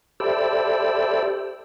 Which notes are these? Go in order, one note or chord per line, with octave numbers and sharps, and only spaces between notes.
G4 A4 C5 D5 E5 B5